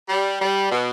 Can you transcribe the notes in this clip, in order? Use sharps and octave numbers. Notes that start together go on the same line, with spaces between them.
G3
G3
B2